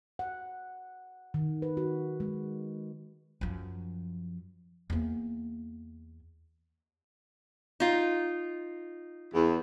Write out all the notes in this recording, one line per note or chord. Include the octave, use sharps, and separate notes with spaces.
F#5
D#3
B4
F#4
G#3
F#2 F3
E2 A#3
D#4 F4
E2